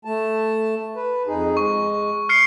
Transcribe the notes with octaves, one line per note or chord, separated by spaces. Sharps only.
A3 A5
B4
F2 D#4 G#4
G#3 C#6
F6 C7 C#7